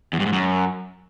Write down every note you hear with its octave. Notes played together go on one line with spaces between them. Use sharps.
E2
G2
G#2
F#2